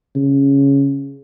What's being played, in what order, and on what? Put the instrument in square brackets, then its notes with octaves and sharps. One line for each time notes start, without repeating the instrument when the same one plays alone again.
[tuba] C#3